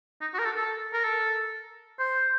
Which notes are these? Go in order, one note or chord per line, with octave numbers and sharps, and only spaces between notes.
D#4
F#4
A#4
A4
A4
A#4
A4
C5